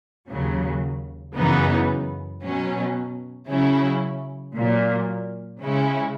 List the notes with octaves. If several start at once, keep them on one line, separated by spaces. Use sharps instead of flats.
D#2 C#3 F#3
F#2 C#3 E3 B3 D#4
B2 F#3 C#4
C#3 F#3 C#4 E4
A#2 F#3 A#3
C#3 G#3 C#4 E4